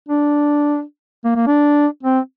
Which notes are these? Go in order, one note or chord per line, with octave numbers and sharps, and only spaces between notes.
D4
A#3
A#3
D4
C4